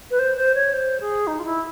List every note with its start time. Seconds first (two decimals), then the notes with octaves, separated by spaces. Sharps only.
0.11 B4
0.19 C5
0.37 C5
0.55 C#5
0.73 C5
1.01 G#4
1.27 D#4
1.39 F4
1.45 E4